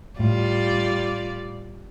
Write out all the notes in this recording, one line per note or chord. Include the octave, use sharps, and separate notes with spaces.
A2 G3 F4 D5